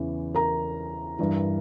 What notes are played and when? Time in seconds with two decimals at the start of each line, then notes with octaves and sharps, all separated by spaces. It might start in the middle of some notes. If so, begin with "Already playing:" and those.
Already playing: E2 C#3 E3
0.34 A#4 A#5
1.19 G2 E3